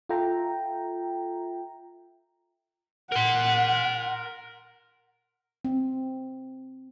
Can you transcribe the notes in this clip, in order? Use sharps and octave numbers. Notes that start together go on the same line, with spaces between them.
F4 A4 E5 G5 A#5
A#4 F#5 C6
C4